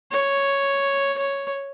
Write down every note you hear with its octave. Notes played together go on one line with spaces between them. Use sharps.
C#5
C#5